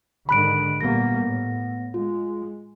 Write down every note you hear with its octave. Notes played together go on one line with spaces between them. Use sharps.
G#2 D3 D#3 B5 F#6 D7
A#2 G3 A#3 B3 A#6
A2
G#3 F4